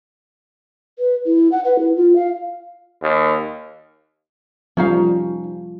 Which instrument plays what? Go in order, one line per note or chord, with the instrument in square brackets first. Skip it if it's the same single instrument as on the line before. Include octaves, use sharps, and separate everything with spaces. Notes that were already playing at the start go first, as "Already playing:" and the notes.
[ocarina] B4
E4
F#5
B4
E4
F4
F5
[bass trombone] D#2
[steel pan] F3 G3 [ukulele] C#4 D#4 F5